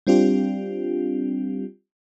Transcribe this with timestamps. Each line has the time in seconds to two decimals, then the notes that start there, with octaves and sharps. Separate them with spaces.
0.07 G3 C4 D4 F4 G4